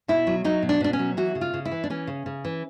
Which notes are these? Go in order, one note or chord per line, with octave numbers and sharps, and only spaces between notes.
B2 E4
F#3
F#3 D#4
B2
D4
B2 D4
C#4
F#3
E3 F#4
C#3
F4
C#3
E4
E3
D4
E3 C#4
C#3
C#3
E3